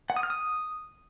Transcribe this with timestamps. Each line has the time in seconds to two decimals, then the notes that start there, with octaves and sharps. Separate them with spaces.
0.10 F#5
0.16 D#6
0.23 F6
0.30 D#6